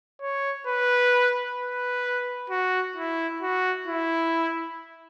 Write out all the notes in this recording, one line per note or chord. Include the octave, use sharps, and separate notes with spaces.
C#5
B4
B4
F#4
E4
F#4
E4